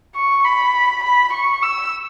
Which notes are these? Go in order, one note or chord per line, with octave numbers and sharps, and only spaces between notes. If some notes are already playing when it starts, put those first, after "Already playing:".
C#6
B5
B5
C#6
E6